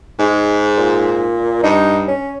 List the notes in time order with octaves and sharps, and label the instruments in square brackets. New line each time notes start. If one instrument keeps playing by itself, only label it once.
[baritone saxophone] G#2 [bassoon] G#3
[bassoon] A#2
[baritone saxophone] G2 [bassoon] D#4
[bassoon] C#4